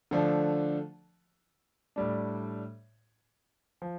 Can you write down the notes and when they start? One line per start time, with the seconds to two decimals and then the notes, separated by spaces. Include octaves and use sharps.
0.11 D3 F3 A3 D4
1.96 A2 G3 D4
3.82 F3